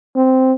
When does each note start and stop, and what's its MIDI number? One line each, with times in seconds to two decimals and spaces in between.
0.16 0.53 60